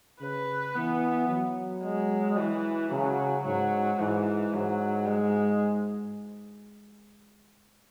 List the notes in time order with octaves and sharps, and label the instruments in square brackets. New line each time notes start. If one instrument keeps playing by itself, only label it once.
[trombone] C#3 [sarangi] B4
[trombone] E3 [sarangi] B3
[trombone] F#3
[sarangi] G#3
E3
[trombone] C#3 [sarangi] F#3
[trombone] G#2 [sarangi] F#3
[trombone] G#2 [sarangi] E3
[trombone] G#2 [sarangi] F#3
[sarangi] G#3